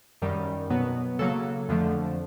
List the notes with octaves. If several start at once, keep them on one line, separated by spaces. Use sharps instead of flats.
F#2 D#3 G3
B2 F#3 B3
C#3 F#3 A#3 A4
F2 D3 F3 A3